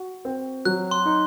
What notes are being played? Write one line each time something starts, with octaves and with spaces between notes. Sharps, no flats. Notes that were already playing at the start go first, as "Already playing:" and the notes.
Already playing: F#4
C4
F#3 F#6
C6
D#4